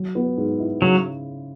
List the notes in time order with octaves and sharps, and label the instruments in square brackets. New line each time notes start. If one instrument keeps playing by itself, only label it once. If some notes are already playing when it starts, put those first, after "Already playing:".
Already playing: [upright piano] F#3
B3
G#2
E4
[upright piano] C#3 [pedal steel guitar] F#3